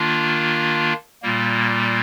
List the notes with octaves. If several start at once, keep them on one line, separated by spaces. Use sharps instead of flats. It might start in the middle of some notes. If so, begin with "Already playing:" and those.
Already playing: D#3 A#3 D4 F4
A#2 G3 A#3